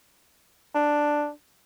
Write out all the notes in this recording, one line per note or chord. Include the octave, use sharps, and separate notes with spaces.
D4